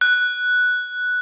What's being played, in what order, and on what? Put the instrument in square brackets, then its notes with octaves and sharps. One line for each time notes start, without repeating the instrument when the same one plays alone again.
[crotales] F#6